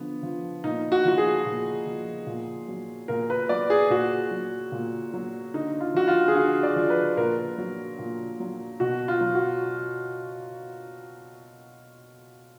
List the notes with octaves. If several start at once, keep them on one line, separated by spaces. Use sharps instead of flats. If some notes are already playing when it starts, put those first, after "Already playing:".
Already playing: D3 F3 B3
F3
A#2 D#4
F#4
F3 F#4
G#4
A#2
F3
A#2
F#3
A#2 A#4
B4
F#3 D5
G#4
A#2 F#4
F#3
A#2
F#3
D3 D#4
F4
F3 F#4
F4
G#4
D3 F#4
D5
F3
B4
A#2 A#4
F#3
A#2
F#3
B2 F#4
F4
F#3
F#4